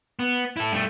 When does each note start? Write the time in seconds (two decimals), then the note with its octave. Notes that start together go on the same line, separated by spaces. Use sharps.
0.19 B3
0.57 E4 A4
0.72 G2 A3